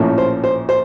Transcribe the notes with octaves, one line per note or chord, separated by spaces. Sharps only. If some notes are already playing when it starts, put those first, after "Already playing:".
Already playing: A#1 A2 F3 A#3 C#4
C5
C5
C5